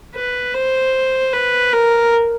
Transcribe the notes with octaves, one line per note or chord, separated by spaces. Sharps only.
B4
C5
B4
A#4